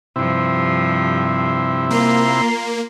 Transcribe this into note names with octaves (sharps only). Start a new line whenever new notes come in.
G2 C3 F3 E4
A#3 F4 A#5 C6